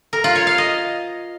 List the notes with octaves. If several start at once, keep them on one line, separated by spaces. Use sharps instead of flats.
A#4
F4
C#5
F5
D#5